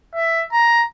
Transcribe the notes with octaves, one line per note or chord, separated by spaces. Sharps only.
E5
A#5